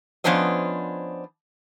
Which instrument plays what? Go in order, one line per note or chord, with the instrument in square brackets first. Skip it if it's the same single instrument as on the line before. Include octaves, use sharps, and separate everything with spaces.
[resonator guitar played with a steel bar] F3 B3 C#4 D4 C5 D#5